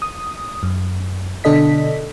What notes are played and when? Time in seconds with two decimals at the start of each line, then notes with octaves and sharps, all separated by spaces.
0.02 D#6
0.63 F#2
1.44 B2 D3 D4 A4 D#5 B6